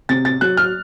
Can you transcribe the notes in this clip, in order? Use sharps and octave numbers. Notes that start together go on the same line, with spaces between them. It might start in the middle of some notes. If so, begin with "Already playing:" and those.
C3 A6
A6
F#3 F#6
F6